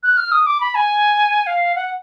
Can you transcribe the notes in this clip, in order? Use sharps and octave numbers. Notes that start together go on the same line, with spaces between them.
F#6
F6
D#6
D6
B5
G#5
F5
F#5